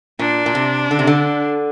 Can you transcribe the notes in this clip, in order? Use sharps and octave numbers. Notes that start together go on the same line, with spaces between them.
A#2 D4
A#2
C3
D3
C3
D3